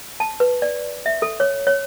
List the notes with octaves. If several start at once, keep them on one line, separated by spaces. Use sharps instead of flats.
A5
B4
D5
E5
A4
C#5
C#5